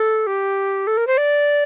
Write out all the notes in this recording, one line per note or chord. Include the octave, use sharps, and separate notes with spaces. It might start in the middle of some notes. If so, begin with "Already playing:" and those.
Already playing: A4
G4
A4
A#4
C5
D5